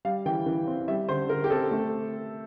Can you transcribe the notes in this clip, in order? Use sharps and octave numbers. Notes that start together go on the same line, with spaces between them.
G3 F5
E3 G5
E3
C4
G3 E5
D3 C5
D3 A#4
G4
C4 A4
A3